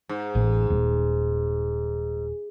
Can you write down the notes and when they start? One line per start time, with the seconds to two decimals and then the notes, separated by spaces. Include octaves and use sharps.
0.09 G#2
0.35 A1
0.70 D#1